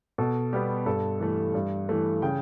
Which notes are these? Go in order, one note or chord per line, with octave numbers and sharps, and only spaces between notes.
B2 A4
G3 B3 G4
G2 A4
E3 A3
G2
E3 A3
C#3 G5